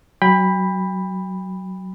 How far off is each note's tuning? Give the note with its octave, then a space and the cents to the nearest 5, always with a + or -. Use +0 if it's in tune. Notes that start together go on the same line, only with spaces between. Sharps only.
F#3 +15 G5 +35 B5 +0